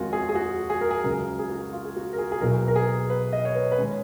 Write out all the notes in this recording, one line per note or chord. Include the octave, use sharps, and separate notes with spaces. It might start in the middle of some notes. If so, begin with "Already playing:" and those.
Already playing: F2 D#3 G#3 C#4 F4 F#4
G#4
G#4
F#4
G#4
A#4
G#4
C#2 C#3 F#3 A#4
G#4
F#4
F4
G#4
F#4
A#4
G#4
G#4
B1 B2 A#3 A#4
A#4
G#4
B4
D#5
C#5
B4
B4
D#3 G#3 C#4 C#5